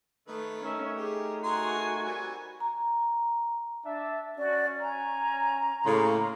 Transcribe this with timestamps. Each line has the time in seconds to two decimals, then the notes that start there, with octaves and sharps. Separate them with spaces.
0.28 D#3 A3 B4
0.64 A3 C#4 D#4 A#4 E5
0.96 G4 G#4
1.44 F#4 G#4 G#5 A#5 C6
2.04 G3 C4
2.60 A#5
3.85 D4 E5 A5
4.38 C#4 F#4 D5
4.80 G#5 A#5
5.85 A2 C#3 A#3 C#5 B5 C6